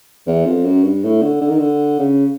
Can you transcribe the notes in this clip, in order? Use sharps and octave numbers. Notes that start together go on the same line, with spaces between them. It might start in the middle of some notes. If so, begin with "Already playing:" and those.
E2
F2
F#2
G2
A2
D3
D3
D#3
D3
C#3